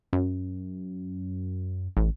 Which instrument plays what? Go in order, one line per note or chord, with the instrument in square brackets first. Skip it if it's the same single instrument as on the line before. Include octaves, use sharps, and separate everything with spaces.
[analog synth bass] F#2
A1